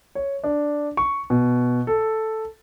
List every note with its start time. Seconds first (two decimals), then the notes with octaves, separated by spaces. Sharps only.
0.15 C#5
0.44 D4
0.97 C#6
1.30 B2
1.87 A4